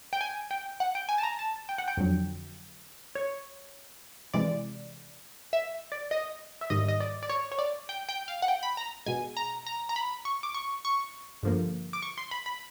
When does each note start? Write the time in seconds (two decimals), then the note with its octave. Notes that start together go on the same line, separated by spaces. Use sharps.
0.13 G5
0.21 G#5
0.51 G5
0.80 F#5
0.95 G5
1.09 G#5
1.18 A5
1.23 A#5
1.39 A5
1.69 G5
1.78 F#5
1.88 G5
1.97 F2 D3 F#3
3.15 C#5
4.34 C3 E3 G#3 D5
5.53 E5
5.92 D5
6.11 D#5
6.61 E5
6.70 G#2 D#3 G3 D#5
6.88 D#5
7.00 D5
7.23 D5
7.29 C#5
7.52 C#5
7.59 D5
7.89 G5
8.09 G5
8.28 F5
8.42 F#5
8.48 G5
8.63 B5
8.77 A#5
9.06 B2 G#3 G#5
9.37 A#5
9.66 A#5
9.89 A#5
9.96 B5
10.25 C#6
10.43 D6
10.54 C#6
10.85 C#6
11.43 G2 D3 F3 A#3
11.93 D6
12.02 C#6
12.18 C6
12.31 B5
12.46 B5